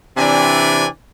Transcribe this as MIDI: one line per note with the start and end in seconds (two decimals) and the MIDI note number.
0.17 0.87 48
0.17 0.87 52
0.17 0.87 60
0.17 0.87 62
0.17 0.87 74
0.17 0.87 80